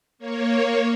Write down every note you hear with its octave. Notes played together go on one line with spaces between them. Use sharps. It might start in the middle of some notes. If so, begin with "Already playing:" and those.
A#3 C#5